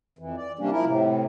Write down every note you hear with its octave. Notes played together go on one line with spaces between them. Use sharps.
F2 E3
D5
C3 G3 A#3 C#4 D4
F3 E4 A#4
A2 C3